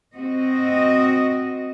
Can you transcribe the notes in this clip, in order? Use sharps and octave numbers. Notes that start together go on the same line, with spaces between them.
C4 F#4 D#5